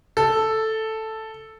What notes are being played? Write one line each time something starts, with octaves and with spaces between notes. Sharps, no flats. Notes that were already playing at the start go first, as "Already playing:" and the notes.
A4